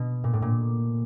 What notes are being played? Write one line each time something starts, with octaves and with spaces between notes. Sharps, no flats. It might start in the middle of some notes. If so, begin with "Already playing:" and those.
Already playing: B2
A#2
A2
A#2